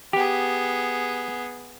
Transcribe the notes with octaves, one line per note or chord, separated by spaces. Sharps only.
B3 G4 G#4